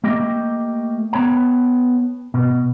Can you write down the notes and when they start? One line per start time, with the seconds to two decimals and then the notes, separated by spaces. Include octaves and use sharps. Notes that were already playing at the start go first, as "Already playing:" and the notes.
0.04 A3 A#3 G4 D#5 G5
1.13 B3 C#5 G5 A5
2.34 B2